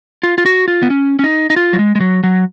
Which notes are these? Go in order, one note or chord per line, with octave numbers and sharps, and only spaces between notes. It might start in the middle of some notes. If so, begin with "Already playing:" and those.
F4
F4
F#4
F4
B3
C#4
C#4
D#4
D#4
F4
F#3
G#3
G#3
F#3
F#3